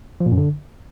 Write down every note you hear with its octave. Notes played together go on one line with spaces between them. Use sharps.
F3
A#2
F#2
D3